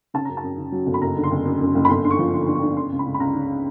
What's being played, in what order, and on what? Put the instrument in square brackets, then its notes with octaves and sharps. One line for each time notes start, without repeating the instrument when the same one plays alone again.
[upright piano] C#3 A5
F#2 A#5
A5
F#2
C#3
F#3
G1
B5
F#1 A#5
D3
C6
F#1
F#2
F#2
F#1
B5
G1 C6
D3 C6
C#6
F3
D3 C6
G2 C6
C#6
G2
C#3 C6
C#2
B5
C#2
B5
C#2 A#5
C#3